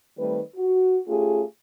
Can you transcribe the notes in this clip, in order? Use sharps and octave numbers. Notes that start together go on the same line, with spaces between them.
D#3 G3 A3 C4 B4
F#4
A3 C#4 F4 G4 G#4